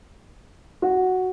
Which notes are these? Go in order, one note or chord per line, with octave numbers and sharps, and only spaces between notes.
F#4